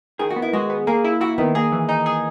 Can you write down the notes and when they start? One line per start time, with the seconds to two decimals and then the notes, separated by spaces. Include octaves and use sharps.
0.19 D#3 G#4
0.30 F#4
0.36 B3
0.42 E4
0.53 G#3 F#4
0.70 B3
0.87 A#3 G#4
1.04 E4
1.21 E4 F#4
1.38 D#3 B3
1.55 A#3 G#4
1.72 E3
1.89 D#4
2.06 G#4